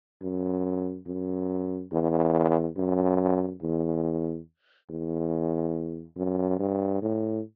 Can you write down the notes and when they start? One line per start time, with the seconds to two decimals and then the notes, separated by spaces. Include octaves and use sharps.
0.22 F#2
1.07 F#2
1.92 E2
2.77 F#2
3.62 E2
4.90 E2
6.16 F#2
6.59 G2
7.02 A2